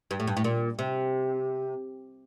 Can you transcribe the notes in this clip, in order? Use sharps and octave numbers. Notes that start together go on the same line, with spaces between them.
G2
A2
G2
A2
A#2
C3